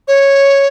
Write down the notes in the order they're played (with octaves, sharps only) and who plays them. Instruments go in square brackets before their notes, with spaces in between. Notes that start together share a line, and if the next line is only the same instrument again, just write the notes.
[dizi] C#5